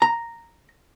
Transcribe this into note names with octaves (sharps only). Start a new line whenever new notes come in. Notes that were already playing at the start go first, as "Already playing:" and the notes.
A#5